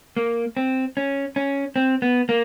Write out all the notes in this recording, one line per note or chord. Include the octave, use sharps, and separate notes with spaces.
A#3
C4
C#4
C#4
C4
B3
A#3